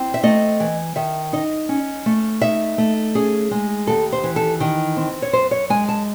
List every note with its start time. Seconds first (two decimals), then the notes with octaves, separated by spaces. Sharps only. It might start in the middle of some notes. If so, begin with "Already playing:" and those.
Already playing: C4 E4
0.14 E5
0.23 A3 D#5
0.60 E3
0.96 D#3 E5
1.33 D#4 D#5
1.69 C#4
2.06 A3
2.41 D#4 E5
2.78 A3
3.15 C#4 G#4
3.51 G#3
3.87 D#2 A4
4.12 C5
4.24 E3
4.36 A4
4.60 D#3
4.97 C4
5.22 C#5
5.33 F#2 C5
5.51 C#5
5.70 G#3 G#5
5.89 A5